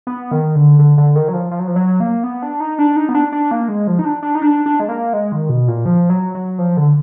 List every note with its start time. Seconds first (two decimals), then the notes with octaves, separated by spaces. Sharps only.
0.07 B3
0.31 D#3
0.55 D3
0.79 D3
0.98 D3
1.16 D#3
1.28 F#3
1.33 F3
1.51 F3
1.59 F#3
1.68 F3
1.76 F#3
2.00 A#3
2.24 B3
2.42 D4
2.60 D#4
2.79 D4
2.96 D#4
3.09 B3
3.15 D4
3.32 D4
3.51 A#3
3.68 G#3
3.87 F3
3.99 D#4
4.05 D4
4.22 D4
4.35 D#4
4.42 D4
4.66 D4
4.80 G#3
4.89 A#3
5.13 G#3
5.32 D#3
5.49 B2
5.68 A#2
5.86 F3
6.10 F#3
6.35 F#3
6.58 F3
6.77 D3